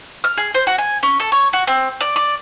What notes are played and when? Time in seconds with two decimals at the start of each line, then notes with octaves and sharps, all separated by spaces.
0.24 F6
0.38 G#4
0.54 C5
0.67 F#4
0.78 G#5
1.03 C#4
1.20 A4
1.32 C#5
1.53 F#4
1.67 C4
2.01 D5
2.16 D5